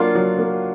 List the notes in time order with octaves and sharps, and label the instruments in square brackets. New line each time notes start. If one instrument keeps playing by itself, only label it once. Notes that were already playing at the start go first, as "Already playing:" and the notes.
Already playing: [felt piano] F#3 A#3 D4 [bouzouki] F4
[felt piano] F#3
A#3